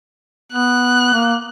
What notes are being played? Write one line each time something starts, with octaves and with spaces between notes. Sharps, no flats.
B3 F#6
A#3